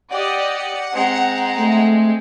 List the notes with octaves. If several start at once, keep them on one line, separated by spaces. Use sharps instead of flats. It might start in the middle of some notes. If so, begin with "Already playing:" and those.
G4 D5 D#5 F#5
G#3 C4 A#5
A3